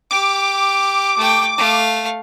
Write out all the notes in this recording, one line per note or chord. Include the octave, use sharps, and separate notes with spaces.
G4 D6
A3 G5
A3 F5